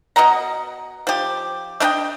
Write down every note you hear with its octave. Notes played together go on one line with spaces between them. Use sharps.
B2 D#5 F#5 A#5
F3 G4
A3 D4 D#5 G5